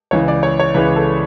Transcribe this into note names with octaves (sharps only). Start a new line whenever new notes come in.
C#2 C#3 E3 C#5
D5
C#5
C#5
C#2 C#3 E3 B4
A4